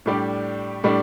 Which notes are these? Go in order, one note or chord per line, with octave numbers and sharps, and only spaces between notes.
A2 G3 D4 G4
A2 G3 D4